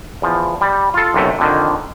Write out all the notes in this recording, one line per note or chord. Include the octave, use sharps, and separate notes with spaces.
E2 F3
G3
F4 A4
B1 F#2 C3 A3
F2 D3 D#3